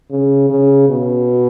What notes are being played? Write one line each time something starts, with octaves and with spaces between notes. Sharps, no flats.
C#3
C#3
B2